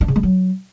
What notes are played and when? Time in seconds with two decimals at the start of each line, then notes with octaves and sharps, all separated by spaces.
0.01 D4
0.08 C#3
0.16 G#3
0.23 F#3